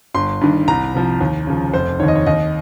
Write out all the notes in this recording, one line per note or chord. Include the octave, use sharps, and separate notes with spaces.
G1 C6
G2 D#3
C2 A#5
C3 F3
D#2
C#3 F3
F1 C5
D#2 D#3 C#5 D#5
C#5
D#2 D#5